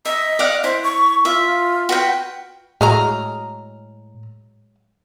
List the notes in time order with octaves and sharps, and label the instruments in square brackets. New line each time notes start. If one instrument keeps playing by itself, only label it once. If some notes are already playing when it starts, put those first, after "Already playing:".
[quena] D#5 [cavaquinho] E5
[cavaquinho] D5 F5 F#5
[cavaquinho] E4 [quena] C5
[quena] C#6
[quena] F4 [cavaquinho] E5
[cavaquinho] F#4 B4 G5
[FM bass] A2 [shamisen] F#3 G#3 [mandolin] A#5 D#6 F6